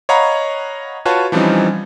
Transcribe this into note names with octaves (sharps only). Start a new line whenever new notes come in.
C#5 D#5 F5 F#5 A#5 B5
F4 F#4 B4 C#5 A5
E3 F3 G3 C4 C#4 D#4